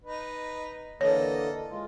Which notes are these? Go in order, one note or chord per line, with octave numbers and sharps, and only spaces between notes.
D#4 B4
D3 E3 A#3 A4 C#5 D#5
G#3 F4